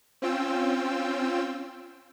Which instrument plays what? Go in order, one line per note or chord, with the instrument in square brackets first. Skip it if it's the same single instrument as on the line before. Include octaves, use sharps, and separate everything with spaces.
[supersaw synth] C4 C#4 F4 G5 E6